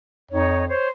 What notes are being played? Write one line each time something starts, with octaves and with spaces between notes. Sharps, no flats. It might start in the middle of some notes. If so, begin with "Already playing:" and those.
F2 D#4 C#5
C5 C#5